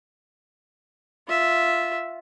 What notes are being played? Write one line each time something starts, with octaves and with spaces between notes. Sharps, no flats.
F4 E5